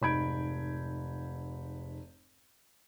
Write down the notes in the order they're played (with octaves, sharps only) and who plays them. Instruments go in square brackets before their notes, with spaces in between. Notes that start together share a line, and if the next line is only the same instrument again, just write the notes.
[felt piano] F1 G#2 B5 G6 G#6 D7